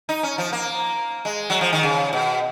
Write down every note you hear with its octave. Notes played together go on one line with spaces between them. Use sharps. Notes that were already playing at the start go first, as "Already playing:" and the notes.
D#4
C#4
F3
A#3
G#3
F#3
F3
D#3
C#3
B2